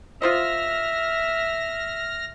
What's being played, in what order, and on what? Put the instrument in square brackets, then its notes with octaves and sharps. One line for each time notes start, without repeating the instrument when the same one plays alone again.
[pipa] F4 C5 D#5 [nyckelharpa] E5 [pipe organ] F6 A#6